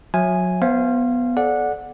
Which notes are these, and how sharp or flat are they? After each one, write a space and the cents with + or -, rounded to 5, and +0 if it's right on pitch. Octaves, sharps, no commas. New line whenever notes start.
F#3 -30 E5 +5 G#5 +0
B3 +0 C5 +25 F5 -20
A4 -35 D5 +0 F#5 -15